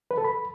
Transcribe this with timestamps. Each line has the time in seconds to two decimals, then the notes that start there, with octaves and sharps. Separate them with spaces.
0.11 B4
0.18 A4
0.24 B5